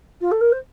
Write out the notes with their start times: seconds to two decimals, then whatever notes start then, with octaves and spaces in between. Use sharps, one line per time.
0.21 F4
0.31 A4
0.41 A#4
0.52 C5